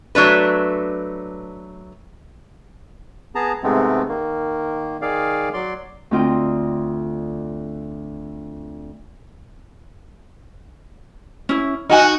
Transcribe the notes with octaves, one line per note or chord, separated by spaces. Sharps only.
F#3 A3 D4 B4
B3 G#4 A5 A#5
G#2 C3 G#3 A3 B3 C4
D#3 A#3
D#3 G#4 D5 F5
F#3 D5 C6
D2 D3 C4 F4 D#5 G5
C#4 E4
D#4 F#4 A#4 G#5